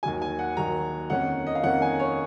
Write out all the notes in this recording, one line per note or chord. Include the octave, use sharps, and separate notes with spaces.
D#2 D#3 F#3 G#5
G#5
F#5
D#2 D#3 F#3 A#5
F2 D#3 A#3 C#4 F#5
D#5
F5
F2 D#3 A#3 C#4 F#5
G#5
C#5